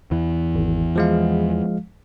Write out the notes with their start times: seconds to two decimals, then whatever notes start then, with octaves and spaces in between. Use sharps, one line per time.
0.11 E2 E3
0.55 G#1
0.96 F3 G#3 F5